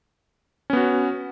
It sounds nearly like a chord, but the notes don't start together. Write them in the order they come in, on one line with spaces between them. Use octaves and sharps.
C#4 B3 F#4